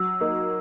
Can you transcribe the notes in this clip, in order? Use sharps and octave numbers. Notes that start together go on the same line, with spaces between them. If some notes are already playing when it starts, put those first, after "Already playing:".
Already playing: F#3 E6
A#3 D#4